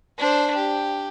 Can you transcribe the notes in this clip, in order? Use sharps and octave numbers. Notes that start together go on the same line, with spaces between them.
D4 C5
G4